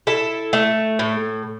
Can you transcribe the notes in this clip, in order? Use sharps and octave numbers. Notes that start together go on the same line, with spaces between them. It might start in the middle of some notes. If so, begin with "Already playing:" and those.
E4 A4
A3
A2